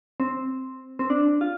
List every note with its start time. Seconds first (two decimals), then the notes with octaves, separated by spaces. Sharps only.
0.20 C4
0.99 C4
1.10 D4
1.41 F4